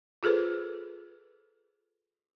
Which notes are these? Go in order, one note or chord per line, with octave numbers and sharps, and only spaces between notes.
F4 G#4 A4 B4 C5